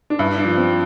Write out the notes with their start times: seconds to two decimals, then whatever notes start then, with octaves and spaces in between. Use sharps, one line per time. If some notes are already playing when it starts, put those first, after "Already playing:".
0.10 D4
0.19 G2 E4
0.38 D4
0.44 F3
0.57 C4